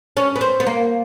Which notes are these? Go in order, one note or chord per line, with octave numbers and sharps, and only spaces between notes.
C#4
B3
C4
B3
A#3